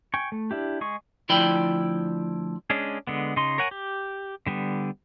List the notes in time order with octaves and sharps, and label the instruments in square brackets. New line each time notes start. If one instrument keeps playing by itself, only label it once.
[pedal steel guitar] G5 G#5 C#6
A3
D4 E4 G4
G#3 G#4 C#6
[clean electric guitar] D2 F3 E4 D5 G5 B5
[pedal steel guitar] G#3 C#4 D4 G#4
D3 G#3 B3
C#3 D#4 C6
A#4 C#5 F#5 G#5
G4
D3 G3 B3